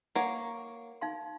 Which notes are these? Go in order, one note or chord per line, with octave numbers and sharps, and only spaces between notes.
A#3 C#5 F#5
D#4 F5 C6